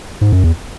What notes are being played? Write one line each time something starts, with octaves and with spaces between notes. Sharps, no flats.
G#2
F#2
E2